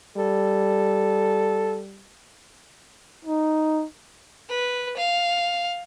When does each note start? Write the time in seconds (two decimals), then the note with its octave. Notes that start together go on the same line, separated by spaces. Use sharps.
0.17 G3 A4
3.25 D#4
4.49 B4
4.97 F5